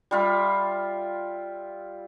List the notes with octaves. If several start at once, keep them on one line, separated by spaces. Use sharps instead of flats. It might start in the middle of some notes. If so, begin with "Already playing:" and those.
G3 F4 E5